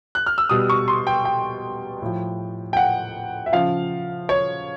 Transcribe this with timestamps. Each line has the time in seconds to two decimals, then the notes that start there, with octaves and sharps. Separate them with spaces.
0.15 F#6
0.26 F6
0.38 E6
0.49 B2 G3 D#6
0.70 C#6
0.88 C6
1.07 G5
1.25 G5
2.02 A2 F3
2.73 G5
2.77 F#5
3.46 E5
3.52 C#3 F3 F5
4.29 C#5